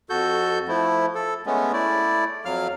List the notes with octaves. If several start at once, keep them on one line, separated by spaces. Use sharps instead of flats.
F2 F#4 A4 G6
F3 A3 E4
A4
G#3 A3 B3 C#4
A3 E4 D5
F2 F#3 F5 F6